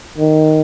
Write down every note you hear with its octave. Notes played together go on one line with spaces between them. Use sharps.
D#3